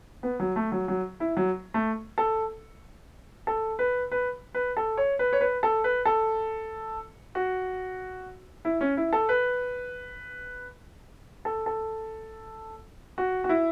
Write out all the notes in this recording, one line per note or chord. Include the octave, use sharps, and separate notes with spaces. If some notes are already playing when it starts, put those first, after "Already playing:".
B3
F#3
A3
F#3
F#3
E4
F#3
A3
A4
A4
B4
B4
B4
A4
C#5
B4
C#5
B4
A4
B4
A4
F#4
E4
C#4
E4
A4
B4
A4
A4
F#4
F#4
E4